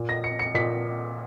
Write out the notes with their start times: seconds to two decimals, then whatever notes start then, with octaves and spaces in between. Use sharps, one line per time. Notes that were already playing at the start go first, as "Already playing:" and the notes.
Already playing: A#2
0.09 A#6
0.24 C#7
0.39 C#7
0.54 A#2 B6